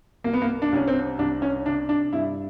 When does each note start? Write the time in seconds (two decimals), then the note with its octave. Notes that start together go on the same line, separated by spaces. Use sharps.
0.24 C2 A#3
0.33 B3
0.42 A#3
0.62 D4
0.72 C2 C#4
0.87 C4
1.19 C2 D4
1.42 C#4
1.66 C3 D4
1.89 D4
2.13 G2 E4